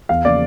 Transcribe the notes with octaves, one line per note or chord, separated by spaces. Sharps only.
E2 F5
C#3 F3 A#3 D5